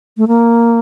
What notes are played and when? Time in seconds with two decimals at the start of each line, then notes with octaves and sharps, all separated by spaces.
0.17 A3
0.28 A#3